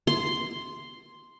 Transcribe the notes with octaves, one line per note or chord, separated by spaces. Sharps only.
C6